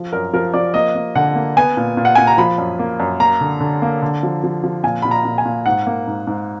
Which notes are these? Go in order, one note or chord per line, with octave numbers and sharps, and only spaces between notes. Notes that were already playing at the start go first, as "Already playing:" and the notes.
Already playing: F3
F#2 A#4
F3 A#4
F3 D5
A#3 D#5
A#3
D3 F#5
A#3
B3 G#5
A#2
A#2
F#5
A#2 G#5
A#5
F3 B5
F#2
A#3
F#2
A#3 A#5
D3
D3
A#3
D3
F3
F3
F3
A#2 G#5
A#2 B5
A#5
A#2
G#5
A#2
G#2 F#5
A#3
G#2
G#2